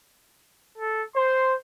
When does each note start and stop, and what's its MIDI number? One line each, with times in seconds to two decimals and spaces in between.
0.78 1.03 69
1.15 1.55 72
1.15 1.53 84